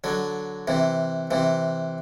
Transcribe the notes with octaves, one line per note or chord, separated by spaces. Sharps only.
D3 F#3
C3 E3
C3 E3